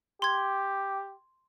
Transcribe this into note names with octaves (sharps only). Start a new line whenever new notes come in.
G4 C6 G#6